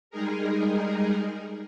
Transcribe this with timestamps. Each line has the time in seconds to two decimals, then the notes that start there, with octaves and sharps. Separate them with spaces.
0.10 G3 G#3 D#4 G#4 A#4